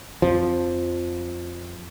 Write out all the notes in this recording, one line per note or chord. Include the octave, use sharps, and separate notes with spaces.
F2 F3